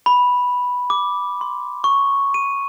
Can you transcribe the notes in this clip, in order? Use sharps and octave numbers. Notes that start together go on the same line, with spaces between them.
B5
D6
C6
C#6
D#7